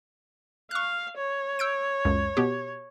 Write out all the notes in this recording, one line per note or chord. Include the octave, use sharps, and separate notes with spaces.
F5 C#6 F#6
C#5
E6 G6 D7
C#2 F#2
B2 B3 G4